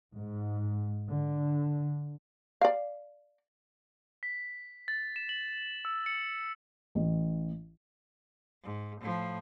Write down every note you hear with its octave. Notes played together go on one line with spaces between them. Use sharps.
G#2
D3
D5 F5
B6
A6
E7
F#7
E6
C#7
A1
G#2
A2 F3